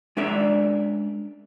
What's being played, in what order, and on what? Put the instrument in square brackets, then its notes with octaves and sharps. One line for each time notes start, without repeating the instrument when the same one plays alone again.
[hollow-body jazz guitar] G#3 C#4 D4 A#4 D5 E5